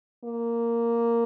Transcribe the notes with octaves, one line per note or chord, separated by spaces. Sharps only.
A#3